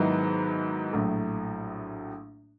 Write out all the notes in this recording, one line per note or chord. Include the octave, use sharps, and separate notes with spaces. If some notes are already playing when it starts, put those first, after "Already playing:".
Already playing: G#2 D#3 F#3 B3 E4
A#1 A2 F#3 A3